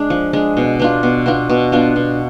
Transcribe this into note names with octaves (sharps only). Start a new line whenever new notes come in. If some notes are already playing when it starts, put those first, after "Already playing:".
Already playing: G#3 D4
F3
G#3 D4
B2
B3 D4 F4
B2
B3 D4 F4
B2
B3 D4 F4
B2